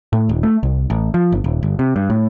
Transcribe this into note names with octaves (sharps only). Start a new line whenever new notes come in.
A2
D#1
A3
C2
A1
F3
G1
D#1
G1
C3
G2
A2